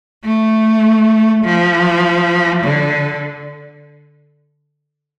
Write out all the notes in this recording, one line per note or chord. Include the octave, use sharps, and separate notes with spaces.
A3
F3
D3